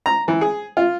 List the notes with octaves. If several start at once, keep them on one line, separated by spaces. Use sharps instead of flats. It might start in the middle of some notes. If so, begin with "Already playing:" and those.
A#5
E3
G#4
F4